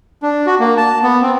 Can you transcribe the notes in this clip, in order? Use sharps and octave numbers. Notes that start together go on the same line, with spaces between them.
D4
F#4
A#3
A5
B3
C4